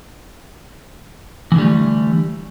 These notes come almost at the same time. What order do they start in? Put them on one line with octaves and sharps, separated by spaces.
E3 D3 G3 A3